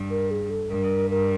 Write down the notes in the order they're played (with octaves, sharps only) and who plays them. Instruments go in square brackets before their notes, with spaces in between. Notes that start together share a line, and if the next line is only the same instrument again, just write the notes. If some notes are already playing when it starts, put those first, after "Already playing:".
Already playing: [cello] G2
[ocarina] A#4
G#4
A4
[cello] G2 [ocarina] A#4
[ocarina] A#4